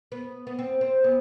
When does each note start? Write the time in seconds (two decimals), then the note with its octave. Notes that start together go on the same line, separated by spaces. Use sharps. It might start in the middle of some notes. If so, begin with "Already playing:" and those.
0.12 B3
0.47 B3
0.59 C4
0.81 C4
1.04 B3